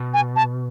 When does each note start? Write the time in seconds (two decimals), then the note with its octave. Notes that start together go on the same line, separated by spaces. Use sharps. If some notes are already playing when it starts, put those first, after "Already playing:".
Already playing: B2
0.14 G#5
0.36 A5